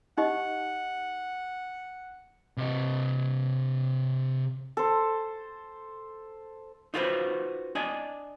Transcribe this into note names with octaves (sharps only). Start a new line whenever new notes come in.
D#4 G4 D#5 F#5
C3 D#5
A4 C5
D#4 F4 F#4 G#4 B4 C5
D4 D5 D#5 G#5